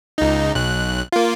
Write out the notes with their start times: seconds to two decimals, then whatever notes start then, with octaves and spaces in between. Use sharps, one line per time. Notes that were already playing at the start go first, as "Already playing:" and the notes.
0.18 C#2 D#4
0.55 B1 F#6
1.13 A#3 F4